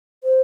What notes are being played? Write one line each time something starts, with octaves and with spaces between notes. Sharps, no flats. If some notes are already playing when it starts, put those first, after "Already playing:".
C5